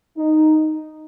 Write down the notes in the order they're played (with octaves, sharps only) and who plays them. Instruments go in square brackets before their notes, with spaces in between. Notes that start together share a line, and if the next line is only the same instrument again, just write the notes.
[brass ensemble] D#4